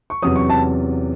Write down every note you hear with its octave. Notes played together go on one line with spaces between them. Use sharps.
C#6
E2 C3 F#3 C#4 D#6
C#6
A5